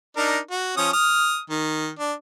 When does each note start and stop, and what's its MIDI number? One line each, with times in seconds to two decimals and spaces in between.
0.17 0.38 62
0.17 0.38 63
0.17 0.38 70
0.51 0.74 66
0.77 0.89 53
0.77 0.89 61
0.77 0.89 87
0.93 1.38 87
0.93 1.38 89
1.50 1.88 51
1.99 2.12 62